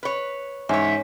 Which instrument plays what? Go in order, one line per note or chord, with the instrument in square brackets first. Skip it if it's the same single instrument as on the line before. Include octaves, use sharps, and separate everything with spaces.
[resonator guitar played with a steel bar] B4 C#5
[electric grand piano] G#2 [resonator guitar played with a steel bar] E3 C#5 [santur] C#4 [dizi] E5